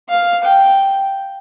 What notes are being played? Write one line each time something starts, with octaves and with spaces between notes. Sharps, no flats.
F5
G5